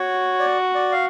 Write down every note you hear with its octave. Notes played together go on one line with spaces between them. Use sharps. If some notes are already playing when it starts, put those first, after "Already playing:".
Already playing: F#4 C#5
D5
D5
F5